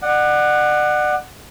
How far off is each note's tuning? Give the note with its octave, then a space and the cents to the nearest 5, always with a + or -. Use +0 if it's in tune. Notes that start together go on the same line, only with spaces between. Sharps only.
D5 +35 F#5 +0